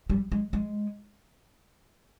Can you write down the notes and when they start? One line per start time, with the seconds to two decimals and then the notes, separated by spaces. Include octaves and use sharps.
0.10 G3
0.32 G#3
0.53 G#3